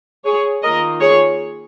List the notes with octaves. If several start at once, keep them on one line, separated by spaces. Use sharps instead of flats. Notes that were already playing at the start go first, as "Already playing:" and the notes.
G#4 C#5
D#3 A#3 F4 A#4 D#5
G#4 C#5